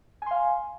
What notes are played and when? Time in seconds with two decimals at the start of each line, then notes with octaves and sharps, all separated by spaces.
0.22 G#5
0.26 C6
0.31 F5